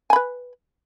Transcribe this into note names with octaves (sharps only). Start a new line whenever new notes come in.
B4 G#5 B5